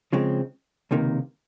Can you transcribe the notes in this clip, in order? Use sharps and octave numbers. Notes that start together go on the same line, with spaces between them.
C#3 F3 G#3 C4
C#2 C3 D#3 A#3